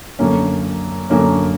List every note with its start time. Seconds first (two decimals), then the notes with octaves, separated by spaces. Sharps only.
0.19 F#2 D3 A#3 C#4
1.10 F#2 D3 A#3 C#4